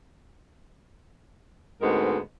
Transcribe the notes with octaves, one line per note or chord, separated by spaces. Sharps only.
D2 G#2 G#3 B3 C4 A#4